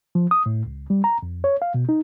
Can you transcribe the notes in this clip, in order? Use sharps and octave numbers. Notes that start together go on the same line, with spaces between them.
F3
D#6
A2
C#2
G3
A#5
F2
C#5
F5
B2
D#4